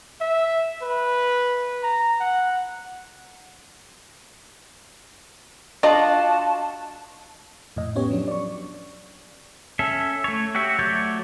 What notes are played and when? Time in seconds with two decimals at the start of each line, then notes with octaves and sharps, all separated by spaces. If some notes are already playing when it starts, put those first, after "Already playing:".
0.21 E5
0.82 B4
1.83 A#5
2.21 F#5
5.83 D4 F4 F#4 D5 D#5 A5
7.76 F2 A2 D#5
7.96 B3 C#4 G4 C#5
8.10 F3 F#3 D4
8.28 D5 C#6
9.79 C#4 A4 E5
10.24 A3 C#5
10.55 F#4 G4 C#5 E5
10.79 F#3 A3 C#5 D5 G6